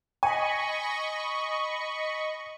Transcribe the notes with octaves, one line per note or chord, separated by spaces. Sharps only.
D#5 G#5 B5 C#6